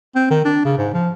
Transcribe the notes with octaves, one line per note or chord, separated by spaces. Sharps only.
C4
D#3
D4
C#3
G#2
F3